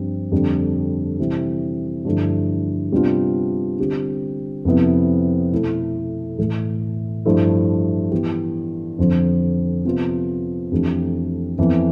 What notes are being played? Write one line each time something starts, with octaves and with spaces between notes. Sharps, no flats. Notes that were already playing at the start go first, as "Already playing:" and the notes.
Already playing: G2 F3 C4
F2 D3 G3
C3 E3 G3 C4 E4
G2 D3 F3 A3 E4
C3 G3 B3 D4 F4
D3 G3 C4 G4
F2 C3 F3 B3 E4
B2 A3 E4 A4
A2 E3 A3
G2 F3 A3 E4
E3 B3 E4 G4
F2 D3 F3
C3 F3 B3 F4
F2 E3 A3 D4 G4
F2 E3 B3